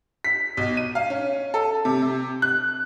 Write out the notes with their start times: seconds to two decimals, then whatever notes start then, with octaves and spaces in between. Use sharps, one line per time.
0.24 B6
0.57 B1
0.77 D#7
0.95 F5
1.10 C#4
1.54 A4
1.85 C3
2.02 C3
2.42 F#6